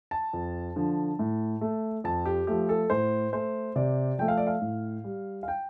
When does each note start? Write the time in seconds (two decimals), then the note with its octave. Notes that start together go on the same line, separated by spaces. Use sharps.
0.11 A5
0.33 F2
0.76 D3 F3
1.19 A2
1.61 A3
2.04 F2 A5
2.26 G4
2.47 F3 A3 G4
2.69 A4
2.90 A2 C5
3.33 A3 C5
3.76 C3 D5
4.18 F3 A3 G5
4.28 F5
4.37 D5
4.47 F5
4.61 A2
5.04 G3
5.43 F5
5.48 G5